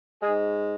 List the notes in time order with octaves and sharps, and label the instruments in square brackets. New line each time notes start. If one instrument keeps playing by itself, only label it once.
[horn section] G#2 G#3 G#4